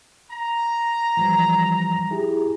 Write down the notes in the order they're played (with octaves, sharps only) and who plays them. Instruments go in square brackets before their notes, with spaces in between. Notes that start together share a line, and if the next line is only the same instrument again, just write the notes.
[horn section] A#5
[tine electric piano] E3 F3 G3
E4 G4 G#4